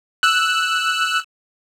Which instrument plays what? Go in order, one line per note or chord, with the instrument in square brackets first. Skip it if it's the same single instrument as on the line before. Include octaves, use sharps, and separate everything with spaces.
[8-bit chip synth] E6 F#6